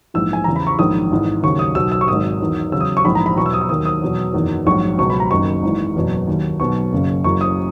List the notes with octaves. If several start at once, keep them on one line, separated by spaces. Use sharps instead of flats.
A#1 G#2 E3 E6
G#5
E2 C#3 E3 A#5
B5
C#6
A#1 G#2 D#3 F#3 D#6
G#1 G#2 E3
D#2 C#3 F#3 C#6
D#6
B1 B2 F#3 E6
E6
C#6
G#1 G#2 D#3 F#3 D#6
E2 D#3 F#3
E2 C#3 F#3 E6
D#6
C#6
A#1 G#2 E3 B5
A#5
B5
E2 B2 F#3 C#6
E6
D#6
E6
D#2 D#3 F#3 D#6
D#6
E2 B2 F#3
F#1 E2 D#3 F#3
A#1 G#2 F#3 C#6
C#2 B2 F#3 C#6
B5
A#5
F#1 F#2 D#3 C#6
G#1 G#2 E3
F#1 E2 B2 F#3
D#2 D#3 F#3
B1 B2 F#3 C#6
F#1 F#2 C#3 F#3
F#1 F#2 C#3 E3 C#6
D#6